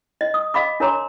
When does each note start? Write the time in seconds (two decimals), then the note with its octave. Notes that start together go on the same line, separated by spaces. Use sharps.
0.21 D#5
0.34 D#6
0.54 D#5 F5 B5 D6
0.80 D4 A#4 C#5 A#5 C6 D6